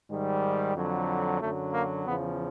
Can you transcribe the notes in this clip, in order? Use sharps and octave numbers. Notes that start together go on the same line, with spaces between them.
G#2 D#3 G3
F2 D3 F#3
F#2 D3 F#3 A3
A#3
E2 C#3 F3 B3